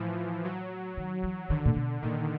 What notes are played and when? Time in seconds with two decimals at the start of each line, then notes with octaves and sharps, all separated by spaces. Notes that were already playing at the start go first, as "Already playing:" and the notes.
Already playing: A2 E3 F3
0.44 F#3
0.97 D#3
1.23 E3
1.50 D3 D#3
1.65 A#2
1.76 B2
2.02 A#2 D#3